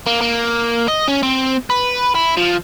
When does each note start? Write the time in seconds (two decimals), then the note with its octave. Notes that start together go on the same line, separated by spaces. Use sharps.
0.06 A#3
0.21 A#3
0.88 D#5
1.08 C#4
1.23 C4
1.70 B4
2.15 E4
2.37 F3